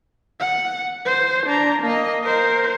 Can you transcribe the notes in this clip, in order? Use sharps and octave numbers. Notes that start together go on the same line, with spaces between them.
F#5
C5
D4 A#5
A#3 D#5
A#4 C5